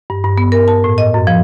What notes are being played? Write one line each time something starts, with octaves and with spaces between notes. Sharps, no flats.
G2
G2
B3
A#4
A5
A2
D#5
F#2
F3